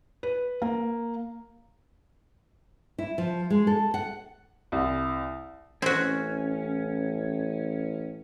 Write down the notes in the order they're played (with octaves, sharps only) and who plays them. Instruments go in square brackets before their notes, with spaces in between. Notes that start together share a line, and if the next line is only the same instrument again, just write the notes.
[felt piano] B4
A#3
[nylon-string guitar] E4
F3
G#3
A4
F#5
[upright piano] C2
[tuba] A1 [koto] C4 F#4 [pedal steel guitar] C#4